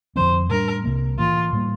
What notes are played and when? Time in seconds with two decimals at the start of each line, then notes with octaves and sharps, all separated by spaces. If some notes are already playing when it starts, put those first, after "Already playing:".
0.16 F2 D3 F3 C4 C5
0.50 A2 G3 A#3 D4 A#4
0.84 C2 C3 G3 A#3
1.18 A2 E3 A#3 F4
1.53 A2 G3 A#3